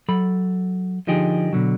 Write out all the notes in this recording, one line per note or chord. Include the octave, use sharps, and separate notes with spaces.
F#3 A4 B5
D3 F3 D#4 G4 G#4
B2 D3 F#3